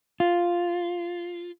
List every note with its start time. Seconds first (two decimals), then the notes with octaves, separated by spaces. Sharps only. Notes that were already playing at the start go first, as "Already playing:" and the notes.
0.20 F4